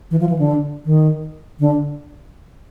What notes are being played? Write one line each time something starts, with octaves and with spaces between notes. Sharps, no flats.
E3
F3
E3
D3
D#3
D3